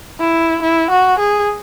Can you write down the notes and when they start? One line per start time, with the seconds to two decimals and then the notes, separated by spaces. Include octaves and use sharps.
0.20 E4
0.62 E4
0.90 F#4
1.18 G#4